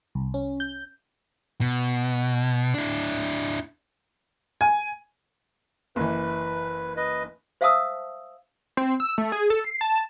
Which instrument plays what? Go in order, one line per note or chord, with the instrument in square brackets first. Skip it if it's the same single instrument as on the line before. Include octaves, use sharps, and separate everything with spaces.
[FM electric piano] C2
C#4
G6
[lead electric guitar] B2
D4 E4
[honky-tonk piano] G#5
[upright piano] F#1 E3 [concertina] B4
[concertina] B4 D#5
[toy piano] C5 E5 F5 A5 D#6 E6
[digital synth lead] C4
E6
A3
G#4
A4
C7
A5